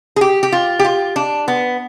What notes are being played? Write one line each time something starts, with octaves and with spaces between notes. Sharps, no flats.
G#4
G4
G4
F4
G4
F4
D4
B3